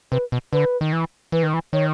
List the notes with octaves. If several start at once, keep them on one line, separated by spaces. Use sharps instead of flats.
C3 B4
B2
D3 B4
D#3
E3
E3 B4
D#3
E3
D#3 C#5